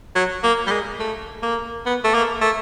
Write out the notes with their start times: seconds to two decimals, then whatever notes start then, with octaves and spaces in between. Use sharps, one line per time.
0.15 F#3
0.43 A#3
0.67 G3
0.71 G#3
0.99 A3
1.42 A#3
1.85 B3
2.04 A3
2.14 A#3
2.41 A3